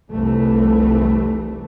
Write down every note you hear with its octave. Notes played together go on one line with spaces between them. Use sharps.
F1 C2 E3 A3